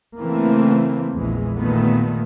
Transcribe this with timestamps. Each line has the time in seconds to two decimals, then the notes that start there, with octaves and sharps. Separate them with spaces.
0.19 C#3 E3 A3 A#3 C4
1.17 A#1 E2 E3 G#3
1.58 A#2 D#3 G#3 A3 B3